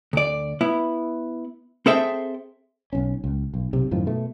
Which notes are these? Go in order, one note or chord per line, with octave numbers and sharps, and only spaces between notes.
D2 D5
B3 E4
C4 G#4 A4 C5 E5 G5
B1 C#4
C#2
B1
B1 C3
F#2 A2 D#3 F3
B2 A3